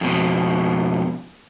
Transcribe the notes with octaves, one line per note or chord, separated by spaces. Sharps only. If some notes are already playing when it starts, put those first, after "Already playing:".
F2 B2